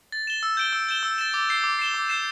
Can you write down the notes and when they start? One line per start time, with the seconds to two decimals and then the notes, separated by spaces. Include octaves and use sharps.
0.12 A6
0.27 E7 G7
0.43 E6
0.57 G6 D7 G7
0.73 E6
0.89 G6 E7 G7
1.03 E6
1.18 A6 E7
1.34 D6
1.49 G6 C7 G7
1.64 D6
1.79 C7 E7 G7
1.94 D6
2.09 G6 C7 E7